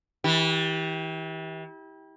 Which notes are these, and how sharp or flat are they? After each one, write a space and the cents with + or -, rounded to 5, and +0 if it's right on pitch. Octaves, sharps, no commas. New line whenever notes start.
E3 -35 G4 +0